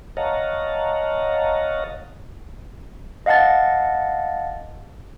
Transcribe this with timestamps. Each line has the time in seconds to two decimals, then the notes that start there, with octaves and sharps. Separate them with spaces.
0.17 C#5 D#5 F5 F#5 A5 A#5
3.26 D#5 F5 F#5 A5 A6